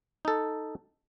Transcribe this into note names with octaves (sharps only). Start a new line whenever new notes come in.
D#4 A4